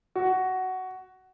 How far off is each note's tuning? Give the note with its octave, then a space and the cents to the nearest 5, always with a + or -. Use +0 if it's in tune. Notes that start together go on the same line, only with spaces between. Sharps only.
F#4 +10